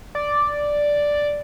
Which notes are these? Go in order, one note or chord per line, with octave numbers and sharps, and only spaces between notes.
D5